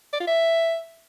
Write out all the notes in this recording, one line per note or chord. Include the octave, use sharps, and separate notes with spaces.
D5
F4
E5